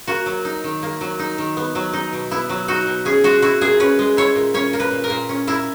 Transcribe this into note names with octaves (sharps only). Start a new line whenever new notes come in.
A#3 F#4
F#3
D#4
D#3
A#3
F#3
D#4
D#3
B3
F#3
D#4
B2
B3 E4
F#3
D#4 F#4
B2
C#4 G#4
G#3 F#4
E4 F#4
A#2 G#4
C#4 B4
G#3
E4 C#5
A#2
C#4 C#5
A#3
B4
A#2
A#4
A#2
C#4
A#3 E4